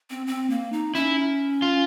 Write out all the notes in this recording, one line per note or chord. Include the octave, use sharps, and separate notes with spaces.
C4
C4
A#3
D#4
C#4 E4
F4